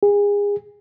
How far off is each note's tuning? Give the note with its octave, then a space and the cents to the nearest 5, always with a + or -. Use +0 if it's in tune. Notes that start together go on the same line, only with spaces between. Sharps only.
G#4 -30